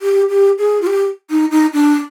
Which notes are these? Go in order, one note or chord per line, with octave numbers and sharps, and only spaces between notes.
G4
G4
G#4
F4
G4
D#4
D#4
D4